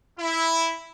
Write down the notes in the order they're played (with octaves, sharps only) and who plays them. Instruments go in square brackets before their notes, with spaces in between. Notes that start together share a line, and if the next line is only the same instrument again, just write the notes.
[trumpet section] E4